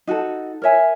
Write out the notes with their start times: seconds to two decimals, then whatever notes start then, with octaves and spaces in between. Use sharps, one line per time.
0.07 D#4 F#4 A4
0.62 A#4 C#5 E5 G#5